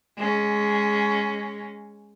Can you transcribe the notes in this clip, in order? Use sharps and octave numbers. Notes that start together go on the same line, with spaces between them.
G#3 C#4